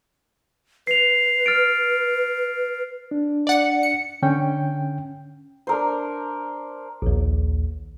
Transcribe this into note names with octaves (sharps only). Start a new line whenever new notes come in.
B4 C7 F7
F6 A6 D7
D4
D5 F#5 C#7
C#7
D3 C#4 G5
D4 A#4 C5
A#1 D#2